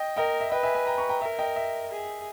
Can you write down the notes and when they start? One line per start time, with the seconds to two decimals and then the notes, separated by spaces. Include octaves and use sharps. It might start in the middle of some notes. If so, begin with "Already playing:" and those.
Already playing: D#5 G5
0.16 A#4 D#5 G5
0.40 E5
0.52 B4 D#5 G5
0.63 E5 G#5
0.75 E5 G#5
0.87 G5 A#5
0.98 A#5 C#6
1.09 G5 A#5
1.22 A#4 E5
1.39 D#5 G5
1.56 E5
1.91 G#4